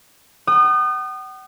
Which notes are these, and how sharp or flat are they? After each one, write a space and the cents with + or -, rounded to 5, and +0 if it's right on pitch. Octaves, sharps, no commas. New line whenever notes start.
F#5 +45 D#6 -30